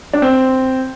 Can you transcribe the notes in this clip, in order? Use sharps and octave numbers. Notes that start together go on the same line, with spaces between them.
D4
C4